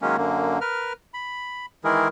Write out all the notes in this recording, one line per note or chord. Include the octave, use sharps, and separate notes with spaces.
D#3 F#3 G#3 A#3 C#4
F#2 D3 A#3
A#4 B4 F6
B5
D#3 E3 G#3 E4 G#4 A#4